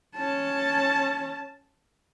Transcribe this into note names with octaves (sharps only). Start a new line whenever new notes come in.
C#4 A5